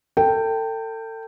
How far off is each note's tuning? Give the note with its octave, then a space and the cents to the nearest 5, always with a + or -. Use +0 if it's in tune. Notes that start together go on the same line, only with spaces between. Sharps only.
A4 +35 G5 +0